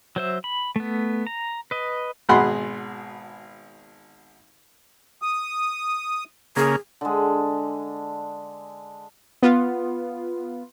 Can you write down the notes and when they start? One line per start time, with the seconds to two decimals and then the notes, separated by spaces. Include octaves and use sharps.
0.16 F#3 C5 E5
0.44 B5
0.76 A3 B3
1.27 A#5
1.71 B4 D#5
2.29 G#1 B2 G#4 F#5 B5 C6
5.22 D#6
6.56 C#3 A#3 G#4
7.01 D3 G#3
9.42 B3 F4